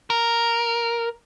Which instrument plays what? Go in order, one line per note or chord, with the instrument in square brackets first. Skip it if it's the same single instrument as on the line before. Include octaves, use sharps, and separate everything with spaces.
[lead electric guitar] A#4